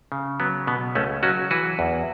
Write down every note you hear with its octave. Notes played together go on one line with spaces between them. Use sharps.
C#3
F#3 B3
B2 B3
C#2 A3 C#4
F#3 C#4 F#4
E3 F#4 B4
E2